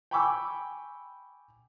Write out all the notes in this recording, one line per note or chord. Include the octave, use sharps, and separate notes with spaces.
G5 G#5 B5 C#6 D6 E6